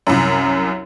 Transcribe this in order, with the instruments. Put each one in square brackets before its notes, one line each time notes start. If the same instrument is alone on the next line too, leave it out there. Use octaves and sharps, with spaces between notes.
[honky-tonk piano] C2 F#2